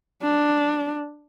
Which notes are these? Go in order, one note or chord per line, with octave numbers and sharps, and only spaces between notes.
D4